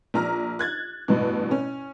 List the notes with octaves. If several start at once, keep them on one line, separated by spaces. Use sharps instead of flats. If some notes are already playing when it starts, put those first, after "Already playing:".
A#1 A#5 F6
F#6 G#6 A6
A1 G2 B2
C#4